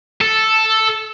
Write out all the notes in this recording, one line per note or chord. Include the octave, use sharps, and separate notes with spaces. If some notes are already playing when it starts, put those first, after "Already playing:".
A4